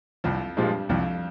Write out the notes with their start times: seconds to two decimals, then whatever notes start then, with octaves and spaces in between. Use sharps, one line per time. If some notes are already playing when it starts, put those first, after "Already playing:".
0.24 C2 F2 F3
0.57 G2 A#2 F3 G3 G#3
0.89 C2 F2 F3